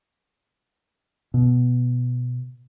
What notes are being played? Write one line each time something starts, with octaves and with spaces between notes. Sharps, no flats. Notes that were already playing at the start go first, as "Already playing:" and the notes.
B2